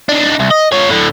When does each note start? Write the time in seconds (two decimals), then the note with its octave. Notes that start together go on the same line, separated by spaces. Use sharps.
0.09 D4 D#4
0.40 C2
0.51 D#5
0.73 F4 C#5
0.90 A2 D3